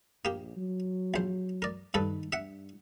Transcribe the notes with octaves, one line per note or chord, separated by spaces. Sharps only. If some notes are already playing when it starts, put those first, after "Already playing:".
A#1 A#3 G4
F#3
A#1 C5
A#4 D5
G2 D#3 A4 B4
G2 E5 F#5